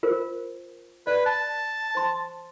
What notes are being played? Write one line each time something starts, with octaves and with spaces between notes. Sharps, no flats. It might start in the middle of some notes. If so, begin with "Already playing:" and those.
F4 A#4 C5
B4 D5
A5
C5 C6